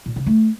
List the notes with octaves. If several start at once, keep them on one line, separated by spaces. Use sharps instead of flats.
A#2
C#3
A3